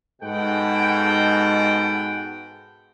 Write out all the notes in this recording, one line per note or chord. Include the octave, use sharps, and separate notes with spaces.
G#2 B2 G#3 A4 F#5 G5